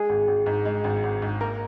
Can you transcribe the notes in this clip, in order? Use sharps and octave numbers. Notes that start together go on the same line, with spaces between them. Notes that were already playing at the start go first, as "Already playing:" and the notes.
Already playing: G#3 G#4
G#1
G#1
G#2
G#3
G#1
G#1
G#2
A#3 A#4